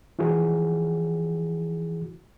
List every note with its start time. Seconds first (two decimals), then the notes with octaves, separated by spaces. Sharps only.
0.19 E3 F3 E4 F#4 G#4